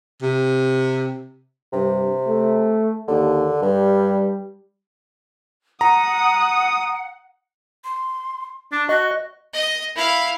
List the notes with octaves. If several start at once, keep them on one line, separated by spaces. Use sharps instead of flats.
C3
G2 C3
A3
D#2 D3
G2 G3
F#5 A#5 D#6
C6
D4 A5
F#4 D#5 F#6
D#5
E4 F5